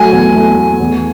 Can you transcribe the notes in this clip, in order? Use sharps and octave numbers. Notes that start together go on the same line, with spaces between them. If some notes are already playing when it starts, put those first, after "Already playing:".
Already playing: F#3 A3 G#5
E2
A3
A3
E2